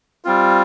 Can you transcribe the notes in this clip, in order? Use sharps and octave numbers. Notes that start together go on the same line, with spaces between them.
G3 C4 F4